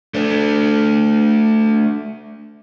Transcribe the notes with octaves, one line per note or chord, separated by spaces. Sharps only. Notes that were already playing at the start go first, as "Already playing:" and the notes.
A3 D4